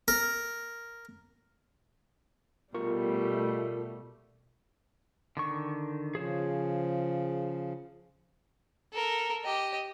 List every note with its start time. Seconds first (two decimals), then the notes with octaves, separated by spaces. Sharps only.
0.08 A#4
2.75 B2 G3 A3 F4 A#4 C#6
5.37 D3 D#3 C#6
6.15 C#3 F3 G#4 C5 C#5
8.93 A4 A#4
9.44 G4 D#5